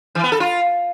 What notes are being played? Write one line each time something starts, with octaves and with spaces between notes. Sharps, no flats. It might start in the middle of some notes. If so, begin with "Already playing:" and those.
E3
B3
A4
F4